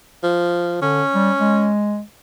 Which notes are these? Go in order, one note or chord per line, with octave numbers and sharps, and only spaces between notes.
F3
D3 C#4
G3
G#3